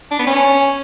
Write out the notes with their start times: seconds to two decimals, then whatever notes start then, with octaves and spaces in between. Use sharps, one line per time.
0.11 D4
0.19 B3
0.27 C#4